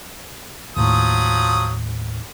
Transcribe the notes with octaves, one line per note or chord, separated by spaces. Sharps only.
D#2 A2 F3 F#3 D#6